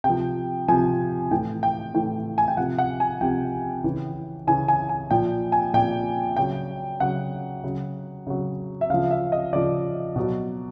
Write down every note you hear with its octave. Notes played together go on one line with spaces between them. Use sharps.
C3 G5
F3
C3 F3 G#5
A2 E3 G5
G5
A2 E3 G5
G#5
G5
C3 F3 F#5
F#5
G#5
C3 F3 G5
C#3 E3
C#3 E3 G#5
G#5
G#5
A#2 F3 G5
G#5
A#2 F3 G5
C#3 F#3 G5
C#3 F#3 F#5
C#3 F#3
C#3 F#3
E5
C#3 F3 F5
E5
D#5
C#3 F3 D5
B2 F#3